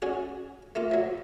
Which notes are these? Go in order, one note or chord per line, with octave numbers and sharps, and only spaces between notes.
C#4 F#4 G#4
A3 A#3 F4
F3 F#3